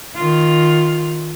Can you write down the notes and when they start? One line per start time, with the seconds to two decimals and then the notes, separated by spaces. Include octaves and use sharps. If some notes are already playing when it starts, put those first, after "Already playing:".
0.15 D#3 F4